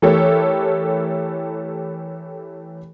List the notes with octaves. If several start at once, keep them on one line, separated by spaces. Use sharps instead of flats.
E3 A3 G4 A4 A#4 C#5